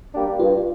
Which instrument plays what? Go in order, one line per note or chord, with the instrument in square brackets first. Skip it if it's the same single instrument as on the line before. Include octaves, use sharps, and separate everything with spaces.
[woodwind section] G3 A#3 D4 G4
[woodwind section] G2 [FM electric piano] F4